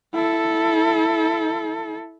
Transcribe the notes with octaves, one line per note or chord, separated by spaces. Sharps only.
E4 A4